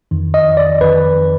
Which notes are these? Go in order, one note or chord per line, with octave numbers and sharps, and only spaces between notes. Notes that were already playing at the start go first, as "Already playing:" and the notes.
F2 D#3
D#5
D5
F2 D#3 B4